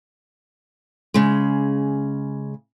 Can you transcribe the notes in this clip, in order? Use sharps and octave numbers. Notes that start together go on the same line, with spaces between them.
C#3 G#3